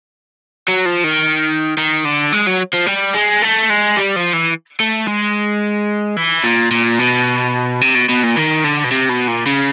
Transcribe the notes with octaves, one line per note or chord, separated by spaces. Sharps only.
F#3
F3
D#3
D#3
D3
G#3
F#3
F3
G3
G#3
A3
G#3
G3
F3
E3
A3
G#3
E3
A#2
A#2
B2
C3
B2
B2
A#2
D#3
D3
B2
C3
B2
A#2
C#3